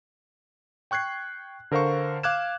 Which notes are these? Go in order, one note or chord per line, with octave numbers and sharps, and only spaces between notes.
G5 C#6 F#6 G#6 C7
D3 A#4 C5 F5 C#6
F5 D6 F#6 G#6 E7